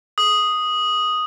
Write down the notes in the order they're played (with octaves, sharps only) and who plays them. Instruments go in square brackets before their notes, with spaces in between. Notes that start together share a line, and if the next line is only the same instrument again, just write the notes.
[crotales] D#6